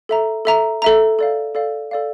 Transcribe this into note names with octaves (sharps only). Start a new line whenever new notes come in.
A4 E5 A#5
A4 E5 A#5
A4 E5 A#5
A4 D5 F5
A4 D5 F5
A4 D5 F5